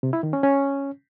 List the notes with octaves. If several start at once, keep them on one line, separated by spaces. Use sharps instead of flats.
C3
E4
D#3
C#4
C#4